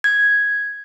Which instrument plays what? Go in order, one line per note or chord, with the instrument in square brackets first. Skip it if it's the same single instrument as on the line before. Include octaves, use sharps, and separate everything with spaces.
[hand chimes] G#6